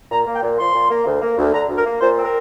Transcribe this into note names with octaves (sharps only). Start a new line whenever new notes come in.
A#2 A#5
A#3
G5
A#2
F3 C6
A#2
A#3
D2
A#3
D2
D3 A#5
D2
A#4
A#3
A#2 C5
C4
A#4